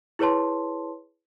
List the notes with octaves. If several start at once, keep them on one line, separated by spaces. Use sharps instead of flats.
E4 G#4 B4 C#5 A5 C6